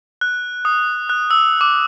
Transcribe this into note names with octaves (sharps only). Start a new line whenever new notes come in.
F#6
D#6
F#6
E6
D6